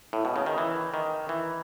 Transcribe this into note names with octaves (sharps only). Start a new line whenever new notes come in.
A2
B2
C#3
D#3
E3
D#3
E3